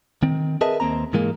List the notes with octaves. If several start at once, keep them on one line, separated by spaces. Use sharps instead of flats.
D#3 C4
G#4 A#4 B4 D#5 E5 A5
D#2 A#3 C4 A#5
G#2 E3 G#3 A#3